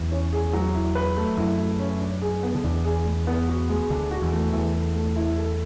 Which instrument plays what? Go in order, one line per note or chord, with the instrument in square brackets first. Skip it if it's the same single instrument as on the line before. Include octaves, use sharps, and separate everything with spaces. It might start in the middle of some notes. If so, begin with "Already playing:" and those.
Already playing: [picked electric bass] E2 E3
[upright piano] C#4
G#4
F#3
E4
B4
A3
[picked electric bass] F#2 F#3 [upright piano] E4
[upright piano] A3
C#4
D4
G#4
B3
[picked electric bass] D3
[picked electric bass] E2 E3 [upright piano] D4
[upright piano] G#4
G#3
B3
F#4
G#3
[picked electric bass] D2 D3 [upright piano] D4
[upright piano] F#4
[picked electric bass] E2 E3
[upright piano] A3
[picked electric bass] E2 E3 [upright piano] E4
[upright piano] A4
A3
E4
A4